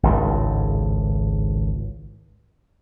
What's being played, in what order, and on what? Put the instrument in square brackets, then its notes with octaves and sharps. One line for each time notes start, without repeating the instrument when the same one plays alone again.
[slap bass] G#1 C#2 A2